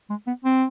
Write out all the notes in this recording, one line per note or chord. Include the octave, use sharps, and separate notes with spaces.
G#3
B3
C4